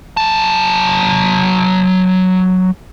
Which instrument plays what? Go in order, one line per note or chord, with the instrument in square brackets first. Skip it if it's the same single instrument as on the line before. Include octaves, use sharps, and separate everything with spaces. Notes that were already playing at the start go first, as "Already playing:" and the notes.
[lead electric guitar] F#3 A5